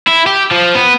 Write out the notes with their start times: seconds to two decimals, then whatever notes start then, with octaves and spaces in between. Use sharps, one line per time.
0.07 E4
0.26 G4
0.51 F3
0.75 B3